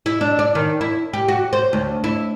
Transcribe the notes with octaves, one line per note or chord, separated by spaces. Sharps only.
E4
D4
D5
D#3
E4
G4
F#4
C5
D2
E4